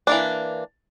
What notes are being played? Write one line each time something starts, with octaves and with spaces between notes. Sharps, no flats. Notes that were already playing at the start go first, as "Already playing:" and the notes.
E3 A#3 D4